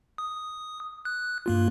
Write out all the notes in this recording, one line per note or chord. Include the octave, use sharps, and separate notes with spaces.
D#6
F#6
G2 A#3 F4